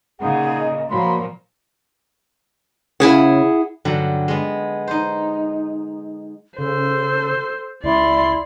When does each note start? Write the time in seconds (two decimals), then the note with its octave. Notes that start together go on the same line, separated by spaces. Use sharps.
0.21 A#2 C#3 G#3 D#4 G#4 F#5
0.59 D#5
0.90 A#2 F3 F#3 A#3 B5 C6
3.00 C#3 E4 G#4 F#5
3.85 G2 D3 F#3
4.28 G#3 B3
4.88 D#4 C5
6.58 C#3 A4 C5
7.84 C#2 E4 D5 C6